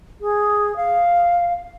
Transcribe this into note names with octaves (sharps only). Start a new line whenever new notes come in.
G#4
F5